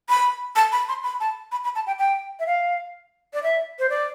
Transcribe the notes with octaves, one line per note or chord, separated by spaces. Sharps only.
B5
A5
B5
C6
B5
A5
B5
B5
A5
G5
G5
E5
F5
D5
E5
C5
D5